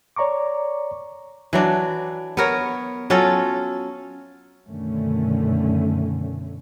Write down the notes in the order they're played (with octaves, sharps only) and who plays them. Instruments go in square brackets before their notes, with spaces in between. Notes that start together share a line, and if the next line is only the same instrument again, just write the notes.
[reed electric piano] C#5 D5 A#5 C#6 D6
[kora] E3 F#3 D4
B3 A#4 C#5
F#3 C#4 F4 A4
[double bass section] F#2 B2 D3 D#3 A3 C#4